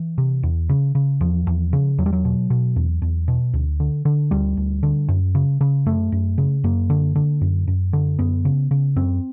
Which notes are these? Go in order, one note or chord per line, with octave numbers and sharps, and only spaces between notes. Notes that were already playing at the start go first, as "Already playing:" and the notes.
Already playing: E3
C3
E2
C#3
C#3
E2 F3
E2
C#3
E2 F#3
G3
F#3
B2
B2
E2
E2
B2
D2
D3
D3
D2 G3
D2
D3
F#2
C#3
C#3
F#2 A3
F#2
C#3
F#2 A#3
D3
D3
F#2
F#2
D3
F#2 B3
C#3
C#3
F#2 C4